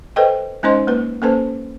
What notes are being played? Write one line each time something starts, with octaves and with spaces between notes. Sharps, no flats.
A4 B4 C5 D#5 G5
G#3 C#4 D#4 C5 D#5 C6
A#3 B4
A#3 C#4 A4 B4 C5 A5